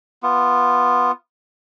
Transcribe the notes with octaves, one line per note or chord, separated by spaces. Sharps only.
B3 F4